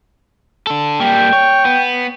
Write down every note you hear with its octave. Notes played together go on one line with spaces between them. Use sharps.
D4 A4
G3 A#3 G5
C#5
B3